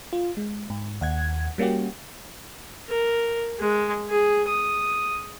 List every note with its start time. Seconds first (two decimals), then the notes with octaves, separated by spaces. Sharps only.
0.13 F4
0.37 G#3
0.70 G#2
1.01 D#2 F#5 G#6
1.58 G3 A#3 C#4 F#4 G4
2.89 A#4
3.59 G#3
4.10 G#4
4.48 D#6